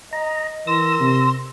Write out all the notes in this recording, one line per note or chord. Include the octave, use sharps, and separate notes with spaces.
D#5 A#5
E3 A#4 C6 E6 A#6
C3